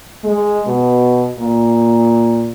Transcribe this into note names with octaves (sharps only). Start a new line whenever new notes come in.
G#3
B2
A#2